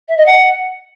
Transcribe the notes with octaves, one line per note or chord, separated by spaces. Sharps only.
E5
D#5
F#5